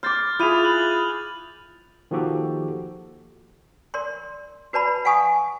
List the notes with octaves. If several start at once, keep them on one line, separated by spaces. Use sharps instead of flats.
C6 D6 F6 G6 A6
E4 F4 G#4 D#6 D#7 F7
F#6 F#7
D#3 F3 A#3 F#4 G4 A4
A#4 D5 C6
F#4 B4 D5 A5 B5
F5 F#5 G#5 C#6 D#6